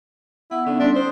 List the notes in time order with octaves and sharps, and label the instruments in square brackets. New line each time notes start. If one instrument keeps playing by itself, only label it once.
[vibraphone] B3 F#5 [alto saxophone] E4
[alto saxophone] D3 [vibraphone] B3 C#4 D#4
[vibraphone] G3 C6 [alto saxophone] D4
[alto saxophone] C5 [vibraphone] D5 D#6